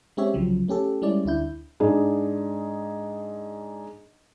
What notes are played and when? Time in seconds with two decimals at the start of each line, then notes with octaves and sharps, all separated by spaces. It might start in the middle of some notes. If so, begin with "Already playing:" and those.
0.17 G#3 C4 C#4 G4 C#5 E5
0.34 C2 C#3 F3 F#3
0.68 A3 C#4 G4 A4
1.02 G3 G#3 C#4 E4 D5
1.25 D2 D4 E4 G6
1.80 G#2 D4 G#4